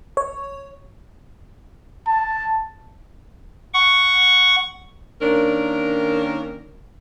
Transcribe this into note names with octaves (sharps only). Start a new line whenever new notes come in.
C#5
A5
F#5 C#6
D#3 A#3 C#4 D4 A#4